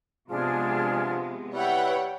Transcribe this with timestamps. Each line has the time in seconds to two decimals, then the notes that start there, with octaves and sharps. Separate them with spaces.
0.30 C3 F3 G#3 B3 D4 G#4 F6
1.53 G3 E4 B4 C#5 F#5 G5